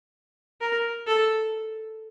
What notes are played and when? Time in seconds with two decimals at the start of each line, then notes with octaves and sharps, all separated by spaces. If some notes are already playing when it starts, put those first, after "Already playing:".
0.61 A#4
1.07 A4